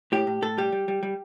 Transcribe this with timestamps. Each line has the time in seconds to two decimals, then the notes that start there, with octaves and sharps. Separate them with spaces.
0.12 A2 G4
0.27 A2
0.42 A2 A4
0.58 G3 G4
0.72 G3
0.88 G3
1.03 G3